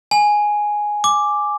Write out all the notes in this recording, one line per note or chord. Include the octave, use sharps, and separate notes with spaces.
G#5
D6